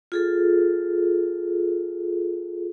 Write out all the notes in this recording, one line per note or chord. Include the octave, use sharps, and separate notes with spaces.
F4 G#4 A4